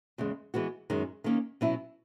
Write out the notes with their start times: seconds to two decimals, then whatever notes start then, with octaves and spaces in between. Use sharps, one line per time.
0.18 E2 C#3 G#3
0.54 E3 G#3 B3 F#4
0.90 F#2 D#3 G#3
1.24 D#3 A#3 C#4
1.61 B2 F#3 C#4 E4